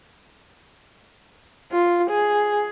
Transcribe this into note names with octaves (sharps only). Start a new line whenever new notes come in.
F4
G#4